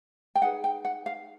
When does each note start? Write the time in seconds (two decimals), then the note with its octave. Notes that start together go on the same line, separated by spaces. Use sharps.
0.35 G5
0.42 D#4 G#4 B4 F#5
0.64 G5
0.85 F#5
1.06 F5